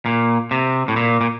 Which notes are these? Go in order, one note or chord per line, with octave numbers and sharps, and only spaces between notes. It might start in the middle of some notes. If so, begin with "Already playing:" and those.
A#2
C3
A2
A#2
A#2